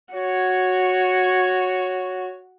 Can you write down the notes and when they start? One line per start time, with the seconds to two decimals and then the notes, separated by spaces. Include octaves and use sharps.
0.14 F#4 C#5